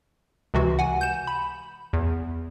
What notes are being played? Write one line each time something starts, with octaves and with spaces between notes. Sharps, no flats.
C#2 C3 E3 F#4
F#5 G#5
G6 E7
B5
E2